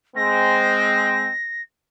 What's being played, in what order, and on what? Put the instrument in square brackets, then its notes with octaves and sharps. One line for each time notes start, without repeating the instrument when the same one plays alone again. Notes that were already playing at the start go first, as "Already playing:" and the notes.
[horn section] G#3 C4 [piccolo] A#6